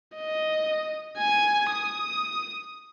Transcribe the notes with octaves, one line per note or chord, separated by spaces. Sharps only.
D#5
G#5
D#6